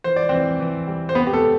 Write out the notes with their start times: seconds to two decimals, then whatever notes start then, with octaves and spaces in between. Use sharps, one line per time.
0.04 E3 C5
0.16 D5
0.29 E3 C4 C5
0.60 E3
0.87 G3
1.09 C5
1.15 B3 C4 B4
1.27 G4
1.33 A3 A4
1.43 C4